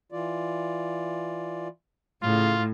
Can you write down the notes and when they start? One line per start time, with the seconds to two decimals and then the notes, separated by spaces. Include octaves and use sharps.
0.12 E3 F4 D5
2.23 A2 C#3 F4